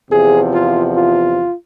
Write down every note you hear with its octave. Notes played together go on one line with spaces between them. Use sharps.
E2 C3 F3 G#4
F4
F4